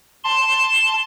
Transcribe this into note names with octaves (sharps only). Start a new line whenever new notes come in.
A5 C6